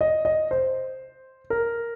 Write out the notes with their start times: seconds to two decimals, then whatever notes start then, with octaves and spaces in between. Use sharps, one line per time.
0.01 D#5
0.25 D#5
0.51 C5
1.50 A#4